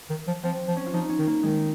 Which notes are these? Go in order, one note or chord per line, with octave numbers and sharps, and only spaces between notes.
D#3
F3
F3 C4
F3
C#4
F4
F3 D#4
C#4
D#3
A#3
D#3 G#3